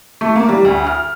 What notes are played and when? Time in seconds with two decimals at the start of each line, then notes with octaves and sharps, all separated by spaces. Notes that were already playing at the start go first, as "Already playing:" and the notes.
0.21 A3
0.36 A#3
0.48 G3
0.65 D2
0.87 F6